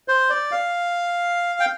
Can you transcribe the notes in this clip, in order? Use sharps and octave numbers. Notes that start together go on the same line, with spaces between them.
C5
D5
F5
G5